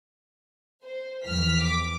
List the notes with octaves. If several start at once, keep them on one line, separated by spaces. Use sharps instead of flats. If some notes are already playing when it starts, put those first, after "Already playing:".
C5
E2 F3 F6 B6
D6